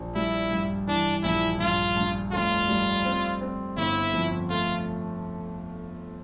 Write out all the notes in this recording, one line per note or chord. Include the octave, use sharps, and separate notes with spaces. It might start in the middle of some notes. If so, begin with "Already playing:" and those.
Already playing: A#1
G3 E4
G2
E3 D4
A#1 E4
G2 F4
G2
F1 F4
G3
C4
C4
G1 E4
F2
A3 F4